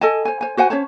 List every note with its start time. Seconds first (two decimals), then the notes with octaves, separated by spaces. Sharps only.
0.01 A4 D#5 G#5 A5
0.25 C5 G#5
0.41 C5 G#5
0.57 F#4 C5 F#5 G#5
0.70 C#4 C5 C#5 A5